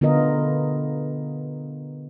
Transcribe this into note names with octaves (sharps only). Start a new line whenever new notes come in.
D3 B3 F4 A#4 D#5